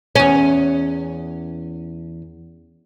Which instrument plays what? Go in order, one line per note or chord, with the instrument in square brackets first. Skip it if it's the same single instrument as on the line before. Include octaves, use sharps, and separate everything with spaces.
[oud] E2 C#4